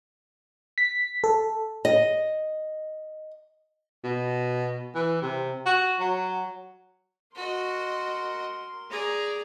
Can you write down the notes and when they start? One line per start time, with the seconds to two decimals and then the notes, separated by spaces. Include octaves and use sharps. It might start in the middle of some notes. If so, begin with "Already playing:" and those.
0.78 B6
1.24 A4
1.85 D#5
4.04 B2
4.95 E3
5.22 C3
5.66 F#4
6.00 F#3
7.35 F#4 A#4 D#5 C6
8.91 G#4 D5 A#5